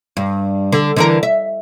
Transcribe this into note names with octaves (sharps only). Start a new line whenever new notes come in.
G2
D3
D3 E3 A#4
E5